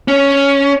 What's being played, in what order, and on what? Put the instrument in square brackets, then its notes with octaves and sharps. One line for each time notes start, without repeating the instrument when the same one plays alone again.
[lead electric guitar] C#4